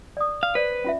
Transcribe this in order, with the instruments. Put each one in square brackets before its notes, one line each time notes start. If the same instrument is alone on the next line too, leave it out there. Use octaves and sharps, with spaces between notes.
[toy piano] D5 D#6
[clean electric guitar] F5
[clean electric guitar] B4 [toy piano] C5 D5
[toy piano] C#4 F4 E5